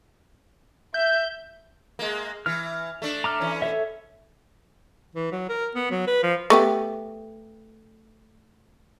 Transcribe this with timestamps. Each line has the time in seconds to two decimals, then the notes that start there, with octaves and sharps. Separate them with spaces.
0.94 E5 G6
1.99 G#3 A#3
2.46 E3 F6
3.02 A3 D4
3.24 A#5 D6 F6
3.40 E3 C#4
3.62 A4 C#5 E5
5.15 E3
5.32 F#3
5.49 A#4
5.75 B3
5.91 F#3
6.07 B4
6.23 F3
6.50 A3 B3 G4